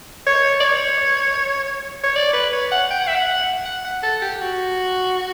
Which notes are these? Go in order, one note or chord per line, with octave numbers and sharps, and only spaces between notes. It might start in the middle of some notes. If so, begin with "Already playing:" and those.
C#5
D5
C#5
C#5
D5
B4
C#5
F#5
G5
F#5
E5
F#5
F#5
F#5
A4
G4
F#4